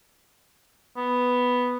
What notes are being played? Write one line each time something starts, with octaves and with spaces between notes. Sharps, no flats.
B3